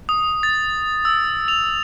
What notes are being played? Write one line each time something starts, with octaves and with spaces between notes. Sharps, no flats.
D#6
A6
E6
F7